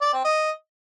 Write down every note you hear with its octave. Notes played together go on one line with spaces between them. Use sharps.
D5
C4
D#5